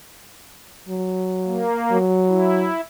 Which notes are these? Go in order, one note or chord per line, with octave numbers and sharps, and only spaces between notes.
F#3
A#3
F#3
E4